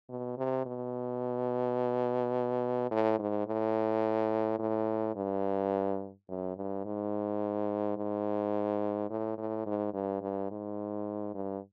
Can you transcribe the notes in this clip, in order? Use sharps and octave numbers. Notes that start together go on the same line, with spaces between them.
B2
C3
B2
A2
G#2
A2
A2
G2
F#2
G2
G#2
G#2
A2
A2
G#2
G2
G2
G#2
G2